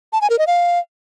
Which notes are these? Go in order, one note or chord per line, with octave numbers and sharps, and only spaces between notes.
A5
G#5
A#4
D#5
F5